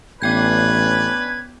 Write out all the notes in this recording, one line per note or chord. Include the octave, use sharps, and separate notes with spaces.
A1 B3 C#4 D4 B4 G5 G6 G#6